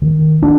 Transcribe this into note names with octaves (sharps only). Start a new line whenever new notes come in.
D#3
D4